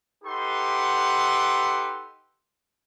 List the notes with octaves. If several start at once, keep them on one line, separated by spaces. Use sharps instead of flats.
D#4 G4 A4 B4 F#5 C6